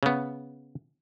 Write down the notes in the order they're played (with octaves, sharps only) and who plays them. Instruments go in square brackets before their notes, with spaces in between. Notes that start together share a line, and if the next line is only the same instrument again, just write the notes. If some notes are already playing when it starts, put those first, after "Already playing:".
[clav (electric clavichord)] C#3 B3